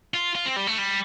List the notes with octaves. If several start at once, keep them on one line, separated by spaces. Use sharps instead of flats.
F4
F4
C4
G3
A3
G3